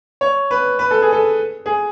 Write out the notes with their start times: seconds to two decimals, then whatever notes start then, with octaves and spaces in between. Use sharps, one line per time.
0.21 C#5
0.51 B4
0.79 B4
0.91 A4
1.02 G#4
1.12 A4
1.66 G#4